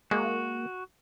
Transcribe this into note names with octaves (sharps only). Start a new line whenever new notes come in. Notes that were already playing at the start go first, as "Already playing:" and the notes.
G#3 A#3 F#4